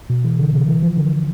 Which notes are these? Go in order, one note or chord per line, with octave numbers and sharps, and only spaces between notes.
B2
E3
D3
C3
E3
F3
D3